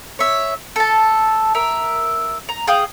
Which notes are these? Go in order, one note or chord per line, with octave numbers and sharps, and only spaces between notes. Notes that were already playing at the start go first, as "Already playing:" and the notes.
C#5 E5
A4 A5
A#4 E5
A#5
G#4 F5 G5 D#6